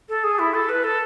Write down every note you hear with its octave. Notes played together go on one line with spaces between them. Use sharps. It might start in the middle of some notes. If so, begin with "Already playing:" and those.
A4
G#4
E4
A4
B4
A4